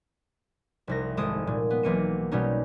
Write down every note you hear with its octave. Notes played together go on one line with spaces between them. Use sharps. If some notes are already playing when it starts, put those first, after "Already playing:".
F1 C2 A#6
G#1 G#3 A4 D#6 D7
A#2 G#3
B3
B1 E3 A#3 C#7 D#7
B2 G3 C#4 D#4